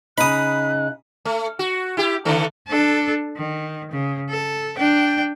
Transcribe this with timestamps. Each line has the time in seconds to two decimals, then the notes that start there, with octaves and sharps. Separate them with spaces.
0.18 C#3 D#4 B5 D#6 F#6
1.25 A3
1.59 F#4
1.97 E4 G4
2.25 D3 D#3 A3
2.68 D4 A4
3.37 D#3
3.91 C#3
4.29 A4
4.78 D4 G5